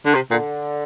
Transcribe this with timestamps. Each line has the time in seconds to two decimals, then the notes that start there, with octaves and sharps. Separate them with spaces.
0.06 D3
0.15 C3
0.31 A#2 D3